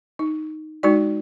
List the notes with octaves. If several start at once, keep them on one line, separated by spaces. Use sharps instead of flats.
D#4
G#3 D#4 F#4 D5